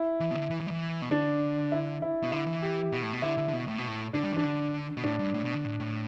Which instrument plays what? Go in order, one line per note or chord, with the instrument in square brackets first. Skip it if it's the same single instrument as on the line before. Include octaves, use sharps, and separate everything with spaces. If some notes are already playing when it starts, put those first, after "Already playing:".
Already playing: [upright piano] E4
[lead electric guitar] E3
B2
D3
E3
E3
G3
E3
B2
[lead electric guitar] D3 [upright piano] D4
[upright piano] E4
E4
[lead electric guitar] B2
[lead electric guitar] D3 [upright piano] E4
[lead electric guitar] E3
[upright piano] G4
[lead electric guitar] B2
A2
B2
[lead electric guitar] D3 [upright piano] E4
[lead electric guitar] D3
D3
B2
A2
B2
A2
[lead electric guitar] D3 [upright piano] D4
[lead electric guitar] G3
[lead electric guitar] E3 [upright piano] D4
[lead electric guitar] D3
B2
[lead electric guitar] A2 [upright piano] D4
[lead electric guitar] G2
A2
B2
D3
A2
A2